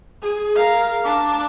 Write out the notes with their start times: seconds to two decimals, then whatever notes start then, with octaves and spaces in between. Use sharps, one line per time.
0.22 G#4
0.55 A#4 F5
1.04 D4 D6